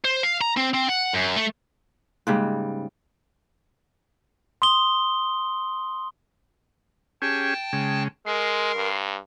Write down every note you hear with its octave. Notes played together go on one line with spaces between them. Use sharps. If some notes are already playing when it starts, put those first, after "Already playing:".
C5
F5
A#5
C4
C4
F#5
F#2
A3
G#2 C#3 G3 G#3 A#3 F#6
C6 D#6 G7
C#4 G4 G#4 G5 A5
C#3 G#3
G#3 A#4 C6
G2